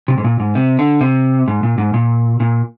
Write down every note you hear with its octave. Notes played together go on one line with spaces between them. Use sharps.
C3
G#2
A#2
G#2
C3
D3
C3
G#2
A#2
G#2
A#2
A#2